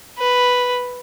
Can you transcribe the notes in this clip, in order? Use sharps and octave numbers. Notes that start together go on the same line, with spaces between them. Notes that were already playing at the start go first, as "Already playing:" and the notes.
B4